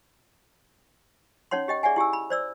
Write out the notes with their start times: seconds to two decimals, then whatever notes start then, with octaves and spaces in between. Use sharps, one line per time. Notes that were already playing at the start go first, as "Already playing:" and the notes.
1.51 C#4 D#4 C#5 F#5 C6
1.68 G4 D#5 G5
1.83 G#4 D5 E5 F#5 G#5
1.96 E4 G4 G#5 E6
2.13 B5
2.30 C5 D5 E6